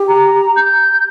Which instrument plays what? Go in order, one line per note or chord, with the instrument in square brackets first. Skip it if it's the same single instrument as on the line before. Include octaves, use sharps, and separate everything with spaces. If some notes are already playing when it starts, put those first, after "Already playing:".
Already playing: [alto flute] G4
[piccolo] A#5
G6